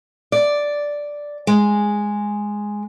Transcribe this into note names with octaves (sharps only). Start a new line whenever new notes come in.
D5
G#3